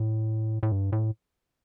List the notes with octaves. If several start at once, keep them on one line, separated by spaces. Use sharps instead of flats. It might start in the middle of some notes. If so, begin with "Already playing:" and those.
Already playing: A2
A2
G2
A2